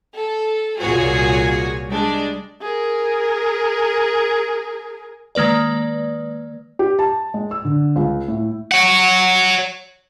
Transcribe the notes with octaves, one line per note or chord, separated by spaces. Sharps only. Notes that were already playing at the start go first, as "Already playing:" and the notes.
A4
C2 A#2 F4 F#4 G#4 C#5
G3 G#3 D4
G#4 A#4
D#3 G#3 A#3 B4 D5
G4
A5
G#3
E6
D3
C#2
A2
C#5 F#5